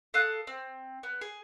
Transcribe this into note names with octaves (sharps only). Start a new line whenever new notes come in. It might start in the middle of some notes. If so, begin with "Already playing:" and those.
A4 F5 D#6 F#6
C4
B3
G#4